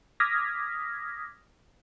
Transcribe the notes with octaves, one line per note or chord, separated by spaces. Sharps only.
D6 D#6 F6 G#6 A#6 B6